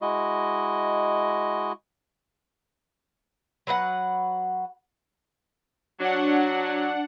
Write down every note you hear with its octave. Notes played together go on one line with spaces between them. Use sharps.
G#3 E4 F#4 D#5
F#3 B4 C5 F#5
F#3 D4 F#5